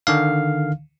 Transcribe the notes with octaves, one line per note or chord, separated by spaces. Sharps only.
D3 D#3 F5